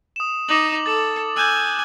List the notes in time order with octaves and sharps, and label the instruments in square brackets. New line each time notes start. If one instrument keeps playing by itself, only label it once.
[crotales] D#6 E7
[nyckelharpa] D#4 [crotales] D6 F#7
[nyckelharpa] A4 [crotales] A6
[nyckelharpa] G#5 [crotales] E6 F#6 G6